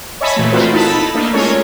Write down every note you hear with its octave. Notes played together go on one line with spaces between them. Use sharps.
C#5 D#5 E5 G#5 A5 B5
A#2 E3 A3
A#3 C4 F4 F#4 A4 B4
D#4 E4 A4 A5 B5
A3 A#3 D4 D#4
G#3 C#4 F4 A4 A#4 C#5